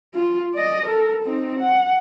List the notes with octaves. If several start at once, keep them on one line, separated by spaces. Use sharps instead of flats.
F4
D5 D#5
A4 A#4
C4 D#4
F#5